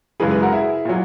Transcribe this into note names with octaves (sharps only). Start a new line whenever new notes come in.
F#2 C#3 E3 G#3 G#4 B4
G#4 B4
F#4 A#4
E4 G#4
A#2 F#3